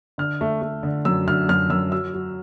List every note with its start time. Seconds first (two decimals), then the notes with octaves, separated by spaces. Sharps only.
0.18 D3 F6
0.41 A3
0.62 A3
0.83 D3
1.05 F#2 E6
1.28 D3 F6
1.49 F#2 F6
1.70 F#2 E6
1.92 F#3 E6
2.14 F#3